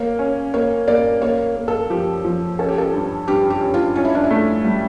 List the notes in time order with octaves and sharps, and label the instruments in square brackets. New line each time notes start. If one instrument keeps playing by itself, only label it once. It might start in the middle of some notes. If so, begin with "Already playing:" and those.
Already playing: [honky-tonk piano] A#3 [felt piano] C#5
[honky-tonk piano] C#4
[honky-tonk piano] A#3 [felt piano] C#5
[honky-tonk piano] A#3 [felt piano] D5
[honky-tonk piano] A#3 [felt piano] C#5
[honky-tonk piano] A#3
[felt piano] A4
[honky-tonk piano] F3 [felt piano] G4
[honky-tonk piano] F3
[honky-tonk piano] C#4 [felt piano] A4
[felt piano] G4
A4
[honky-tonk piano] G2
[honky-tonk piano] G2 [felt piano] G4
[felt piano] G4
[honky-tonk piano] C#4
[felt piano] F4
[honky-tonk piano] C#4 [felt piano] F4
[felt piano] E4
D4
E4
[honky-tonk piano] A3
[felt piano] G3